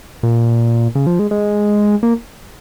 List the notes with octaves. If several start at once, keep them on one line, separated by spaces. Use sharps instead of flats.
A#2
C#3
F3
G#3
G#3
A#3